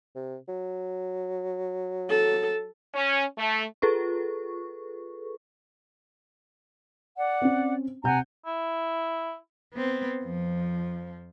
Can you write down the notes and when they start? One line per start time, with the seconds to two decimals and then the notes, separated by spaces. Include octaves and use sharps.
0.16 C3
0.48 F#3
2.10 A4
2.94 C#4
3.37 A3
3.82 F4 G#4 A4 B4 C#6
7.17 D5 F#5
7.42 C4 C#4
8.04 C3 F#5 G#5 A#5 G6
8.46 E4
9.74 B3 C4
10.24 F2 F3